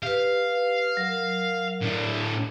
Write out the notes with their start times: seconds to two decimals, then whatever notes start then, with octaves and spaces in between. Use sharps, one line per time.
0.03 G4 B4 F5
0.97 F#3 A#4
1.82 A2 D4